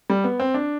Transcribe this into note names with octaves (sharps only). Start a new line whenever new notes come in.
G3
B3
C4
D4